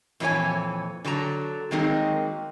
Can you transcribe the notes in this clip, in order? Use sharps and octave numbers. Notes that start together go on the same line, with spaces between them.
F2 A#2 E3 E4 C#5 G#5
D3 F#3 A5 A#5
D#3 F#3 G#3 A#3 C4 D#4